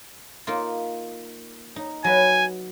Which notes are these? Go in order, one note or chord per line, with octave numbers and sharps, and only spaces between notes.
A#3 D#4 F4
D#4
F#3 B4 G#5